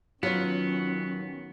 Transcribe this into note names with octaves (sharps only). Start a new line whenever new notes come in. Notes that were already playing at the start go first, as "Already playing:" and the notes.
D#3 F#3 B3 C#4 F4 C#5